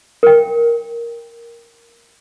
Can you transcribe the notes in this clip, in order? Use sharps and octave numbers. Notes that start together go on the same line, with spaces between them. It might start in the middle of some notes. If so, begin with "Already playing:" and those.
A#4 G5